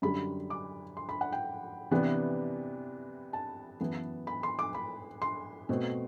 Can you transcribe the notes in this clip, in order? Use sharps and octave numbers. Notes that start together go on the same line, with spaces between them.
F#2 D3 G3 B5
D6
C6
B5
F#5
G5
C3 E3 B3 D4
A5
F#2 E3 B3
B5
C6
D6
B5
C6
B2 A3 C4